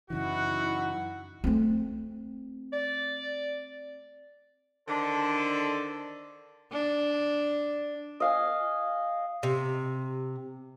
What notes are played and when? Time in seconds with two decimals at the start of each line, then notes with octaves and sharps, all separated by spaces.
0.10 F#2 C#3 E3 D#4 E4 F#4 B4 F#5
1.44 A3 C4
2.73 D5
4.88 D3 D#3 D4 A4 C5
6.72 D4
8.20 D#5 F5 G#5
9.43 C3